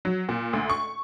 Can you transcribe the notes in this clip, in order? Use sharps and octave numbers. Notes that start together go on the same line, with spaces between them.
F#3
A#2
D2
C#6